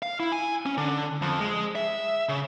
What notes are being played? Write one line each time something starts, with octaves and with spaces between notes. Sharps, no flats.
F5
E4
G#5
C#4
D3
F2
G#3
E5
C#3